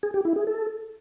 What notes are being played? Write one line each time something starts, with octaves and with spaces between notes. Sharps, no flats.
G#4
G4
E4
G#4
A4